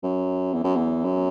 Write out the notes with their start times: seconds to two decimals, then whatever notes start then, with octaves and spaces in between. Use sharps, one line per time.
0.03 F#2
0.53 E2
0.64 F#2
0.76 E2
1.04 F#2